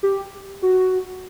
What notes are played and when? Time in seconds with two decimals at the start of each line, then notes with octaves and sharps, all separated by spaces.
0.03 G4
0.62 F#4